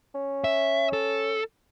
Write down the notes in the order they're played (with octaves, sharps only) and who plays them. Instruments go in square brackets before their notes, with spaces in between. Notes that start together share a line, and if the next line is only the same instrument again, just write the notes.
[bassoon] C#4
[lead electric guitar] E5
A4